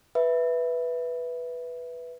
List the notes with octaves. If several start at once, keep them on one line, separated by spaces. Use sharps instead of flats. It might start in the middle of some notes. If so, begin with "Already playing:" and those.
B4 E5